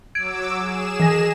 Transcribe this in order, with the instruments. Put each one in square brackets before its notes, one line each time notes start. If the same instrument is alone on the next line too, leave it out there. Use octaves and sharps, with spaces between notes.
[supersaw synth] F#3 D6 E6 [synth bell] G#6 D7
[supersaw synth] G#4 E7
[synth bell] E3 A#6